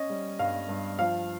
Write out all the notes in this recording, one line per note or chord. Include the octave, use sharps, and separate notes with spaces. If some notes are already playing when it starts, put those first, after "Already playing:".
Already playing: C#4 D#5
G3
G2 F5
G2
F3 F5